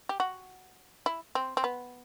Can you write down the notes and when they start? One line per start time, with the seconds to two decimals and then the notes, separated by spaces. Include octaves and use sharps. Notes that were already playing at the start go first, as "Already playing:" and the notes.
0.09 G4
0.20 F#4
1.06 E4
1.35 C4
1.57 C4
1.64 B3